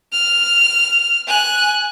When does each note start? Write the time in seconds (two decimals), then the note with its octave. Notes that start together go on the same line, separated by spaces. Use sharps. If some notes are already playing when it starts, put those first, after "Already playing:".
0.13 F6
1.28 G#5 F#6